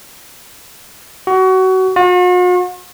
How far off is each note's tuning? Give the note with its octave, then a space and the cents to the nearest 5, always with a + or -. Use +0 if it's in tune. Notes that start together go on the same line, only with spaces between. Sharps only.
F#4 +25
F#4 -45